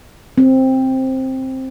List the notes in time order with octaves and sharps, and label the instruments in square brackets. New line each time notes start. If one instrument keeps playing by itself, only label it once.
[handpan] C4